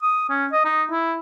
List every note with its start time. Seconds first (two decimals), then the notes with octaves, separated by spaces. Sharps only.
0.02 D#6
0.29 C#4
0.52 D#5
0.65 D#4
0.91 E4